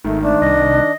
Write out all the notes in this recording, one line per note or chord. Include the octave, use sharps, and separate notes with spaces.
G#1 D#3 A3
A3 D4
C2 D#5